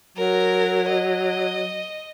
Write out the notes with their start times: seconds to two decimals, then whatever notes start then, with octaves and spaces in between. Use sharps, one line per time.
0.17 F#3 A#4
0.89 D#5